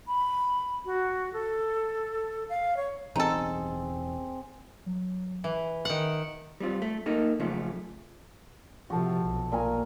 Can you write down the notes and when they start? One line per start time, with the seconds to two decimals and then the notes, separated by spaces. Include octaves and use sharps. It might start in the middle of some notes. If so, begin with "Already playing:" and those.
0.08 B5
0.86 F#4
1.33 A4
2.49 F5
2.77 C#5
3.16 E1 E2 C4 C#4 D#4 G#4 A4
4.86 F#3
5.44 E3 E5
5.85 D#3 F#5
6.60 G3 C4 F4
6.82 A3
7.06 A#3 D#4 A4
7.40 F#2 C#3 F3 A3
8.90 C3 F3 F#4 A4
9.22 B1
9.52 A#2 A#4 G#5